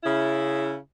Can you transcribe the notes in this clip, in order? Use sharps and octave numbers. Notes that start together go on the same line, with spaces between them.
C#3 E4